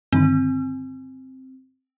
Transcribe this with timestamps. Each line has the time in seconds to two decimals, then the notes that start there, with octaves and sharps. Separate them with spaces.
0.12 G2 D3 D#3 C4